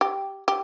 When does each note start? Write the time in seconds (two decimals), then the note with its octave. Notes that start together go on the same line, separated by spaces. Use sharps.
0.01 G4
0.48 G4